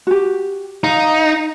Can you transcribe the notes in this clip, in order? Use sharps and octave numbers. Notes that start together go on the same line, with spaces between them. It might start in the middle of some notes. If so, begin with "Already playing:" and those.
F#4 G4
D#4 F5